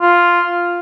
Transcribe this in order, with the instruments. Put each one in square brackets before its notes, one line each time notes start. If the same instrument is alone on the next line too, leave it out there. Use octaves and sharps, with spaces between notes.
[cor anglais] F4